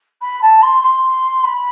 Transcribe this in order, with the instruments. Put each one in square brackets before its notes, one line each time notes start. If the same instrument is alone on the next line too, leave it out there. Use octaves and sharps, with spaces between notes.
[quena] B5
A5
C6
C6
B5